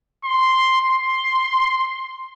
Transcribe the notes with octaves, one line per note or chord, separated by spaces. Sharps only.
C6
C6